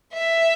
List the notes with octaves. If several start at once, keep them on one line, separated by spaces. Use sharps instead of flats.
E5